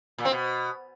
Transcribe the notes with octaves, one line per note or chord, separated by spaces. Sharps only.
A#2
C4
B2